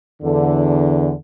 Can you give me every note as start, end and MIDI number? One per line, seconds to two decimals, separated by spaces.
0.22 1.12 40
0.22 1.12 50